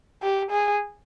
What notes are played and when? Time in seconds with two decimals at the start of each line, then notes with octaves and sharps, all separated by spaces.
0.23 G4
0.51 G#4